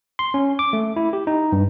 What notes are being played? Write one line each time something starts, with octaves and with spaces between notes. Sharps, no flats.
C6
C#4
D6
A3
E4
G4
D#4
G2